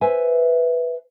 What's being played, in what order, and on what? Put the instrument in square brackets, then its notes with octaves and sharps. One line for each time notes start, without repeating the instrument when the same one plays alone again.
[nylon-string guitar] B4 C5 E5 G#5